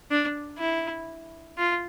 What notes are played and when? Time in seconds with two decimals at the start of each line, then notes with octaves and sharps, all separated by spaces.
0.11 D4
0.59 E4
1.58 F4